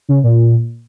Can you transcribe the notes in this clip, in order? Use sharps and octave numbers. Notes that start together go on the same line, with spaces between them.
C#3
A#2